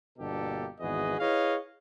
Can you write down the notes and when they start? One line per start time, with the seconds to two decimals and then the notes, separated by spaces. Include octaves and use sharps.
0.19 G1 B2 A#3 D4 G4 A4
0.80 G#1 E2 F#4 G#4 B4 D#5
1.20 E4 G#4 B4 C#5 D#5 F5